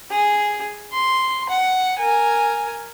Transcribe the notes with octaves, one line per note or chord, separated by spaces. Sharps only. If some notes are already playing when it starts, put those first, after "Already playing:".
G#4
C6
F#5
A#4 G#5